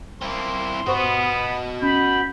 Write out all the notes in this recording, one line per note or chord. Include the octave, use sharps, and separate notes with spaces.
A#3 C4 E4 C6
G2 B3 F#4 C5 D#5 C#6
C#4 B5 G6